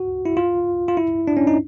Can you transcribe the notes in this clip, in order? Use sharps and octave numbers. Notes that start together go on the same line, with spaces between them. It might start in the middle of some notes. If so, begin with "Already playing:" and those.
Already playing: F#4
E4
F4
F4
E4
D4
C#4
D#4